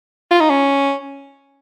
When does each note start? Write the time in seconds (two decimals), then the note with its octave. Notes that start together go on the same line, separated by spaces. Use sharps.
0.31 F4
0.40 D#4
0.50 C#4